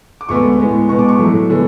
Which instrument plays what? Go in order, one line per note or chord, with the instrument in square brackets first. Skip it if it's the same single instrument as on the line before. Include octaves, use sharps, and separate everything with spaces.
[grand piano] D6
D2 D3 G#3 B3 C#6
A2 G#3 B3
B2 G#3 B3 C#6
D6
C#6
A2 F#3 A3
D3 G#3 B3